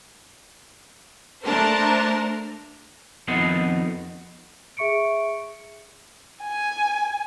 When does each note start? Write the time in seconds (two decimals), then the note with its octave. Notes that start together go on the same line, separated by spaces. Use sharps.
1.44 A3 D4 A#4 C5 A5
3.28 F2 D#3 B3 D#5 F#5 C6
4.77 G#4 E5 C#6 C#7 D7
6.43 G#5